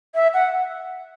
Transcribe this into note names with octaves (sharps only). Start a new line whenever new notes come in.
E5
F#5